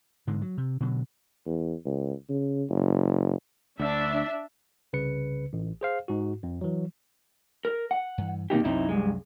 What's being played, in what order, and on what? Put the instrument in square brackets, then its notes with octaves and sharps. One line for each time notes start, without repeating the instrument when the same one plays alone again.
[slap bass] G#2 D3 G#3
F#3
C3
B2 D3 F#3
[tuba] E2
C#2
C#3
F#1
[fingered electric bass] D2 [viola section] D4 E5
[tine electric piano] C2 C#3 B4 C#7
A1
G#4 C5 F5
G#2 F#4
F2
E3 F#3
[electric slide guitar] A#4
F#5
[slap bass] G2 E3
[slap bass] B2 D#3 C4 [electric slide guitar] A#3 D#4 G4
[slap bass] C2 F#2 F#3 [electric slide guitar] C4 D#4 E4
[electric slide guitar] G2 G#3